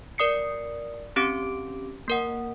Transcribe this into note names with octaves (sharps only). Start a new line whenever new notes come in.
A#4 D5 D#6 C7 C#7
C4 C#4 G4 D6 D7
A#3 A#4 F#5